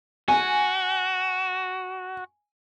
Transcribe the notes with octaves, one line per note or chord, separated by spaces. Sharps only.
F#4 G#5